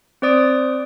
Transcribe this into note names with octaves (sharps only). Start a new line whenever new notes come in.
C4 C5 D5 D#6 D7